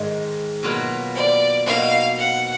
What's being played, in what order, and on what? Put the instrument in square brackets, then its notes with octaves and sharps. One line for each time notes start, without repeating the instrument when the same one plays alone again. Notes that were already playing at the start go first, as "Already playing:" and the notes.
Already playing: [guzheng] G#2 D#3 G#3
B2 F#3 A#3 F4 B4
[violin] D5
[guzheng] B2 A#3 D#4 F#4 [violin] F5
[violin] F#5